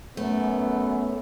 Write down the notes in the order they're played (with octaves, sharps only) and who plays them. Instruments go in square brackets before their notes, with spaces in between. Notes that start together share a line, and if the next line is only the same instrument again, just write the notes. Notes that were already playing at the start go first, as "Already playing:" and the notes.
[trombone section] F#2 B3 [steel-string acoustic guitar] A3